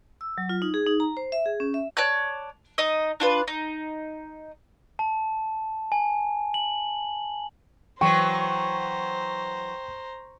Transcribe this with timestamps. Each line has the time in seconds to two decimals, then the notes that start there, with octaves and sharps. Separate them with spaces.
0.21 E6
0.38 F#3
0.49 F4
0.62 D#4
0.74 G#4
0.87 D#4
1.00 A#5
1.17 C5
1.32 E5
1.46 G#4
1.60 C#4
1.74 E5
1.97 C#5 D5 A5 F#6
2.78 D#4 D#5
3.20 D4 F4 B4
3.48 D#4
4.99 A5
5.92 G#5
6.54 F#7
8.01 E3 F#3 C5 G5 A#5 C#6